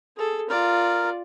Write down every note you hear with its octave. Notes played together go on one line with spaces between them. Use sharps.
G#4 A4
F4 A#4 D5